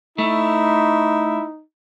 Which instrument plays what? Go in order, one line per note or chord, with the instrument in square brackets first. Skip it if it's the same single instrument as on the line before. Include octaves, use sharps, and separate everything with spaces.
[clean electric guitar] A3 [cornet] D#4 [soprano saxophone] E4